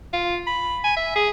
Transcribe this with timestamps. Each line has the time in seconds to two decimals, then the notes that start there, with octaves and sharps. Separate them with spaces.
0.13 F4
0.47 B5
0.84 G#5
0.96 E5
1.15 G#4